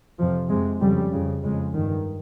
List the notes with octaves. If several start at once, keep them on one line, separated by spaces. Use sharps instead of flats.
F2 C3 F3
F2 C3 G#3
F2 C#3 G3
F2 C#3
F2 C#3 G#3
G2 D#3